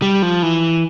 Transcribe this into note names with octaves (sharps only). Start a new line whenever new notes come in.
G3
F3
E3